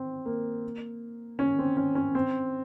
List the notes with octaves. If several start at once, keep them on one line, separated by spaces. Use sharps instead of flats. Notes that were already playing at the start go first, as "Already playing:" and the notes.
Already playing: C4
A#3
C#4
C4
C#4
C#4
C4